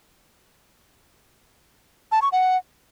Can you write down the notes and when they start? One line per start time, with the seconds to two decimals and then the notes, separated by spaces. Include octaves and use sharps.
2.12 A5
2.22 C#6
2.32 F#5